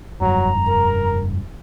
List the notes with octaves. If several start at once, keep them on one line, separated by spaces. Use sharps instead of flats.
F1 G2 F#3 A#5
A#4